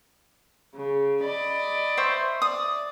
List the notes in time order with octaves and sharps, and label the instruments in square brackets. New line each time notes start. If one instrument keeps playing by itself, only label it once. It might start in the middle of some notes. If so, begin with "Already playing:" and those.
[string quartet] C#3
D5 D#5 B5
[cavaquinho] C5 E5 C#6
[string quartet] D5 [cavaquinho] D#6